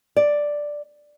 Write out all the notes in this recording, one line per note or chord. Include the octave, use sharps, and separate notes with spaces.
D5